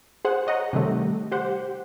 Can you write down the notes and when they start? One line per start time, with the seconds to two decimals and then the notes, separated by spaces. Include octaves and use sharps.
0.25 G#4 C5 F#5
0.47 C#5 D#5 F#5 A#5
0.73 C3 D#3 G3 A3
1.32 G4 C5 F#5